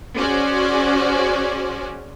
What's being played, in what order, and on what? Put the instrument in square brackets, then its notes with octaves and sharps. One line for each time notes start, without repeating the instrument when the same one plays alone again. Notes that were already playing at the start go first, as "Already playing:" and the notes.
[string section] C#4 F#4 G#4 C5 D5